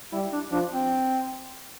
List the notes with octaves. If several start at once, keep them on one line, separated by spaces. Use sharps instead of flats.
G3 E4
D4
F3 D4
C4